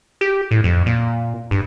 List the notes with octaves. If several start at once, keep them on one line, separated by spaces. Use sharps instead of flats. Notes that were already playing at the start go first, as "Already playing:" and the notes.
G4
A2
F2
A#2
G2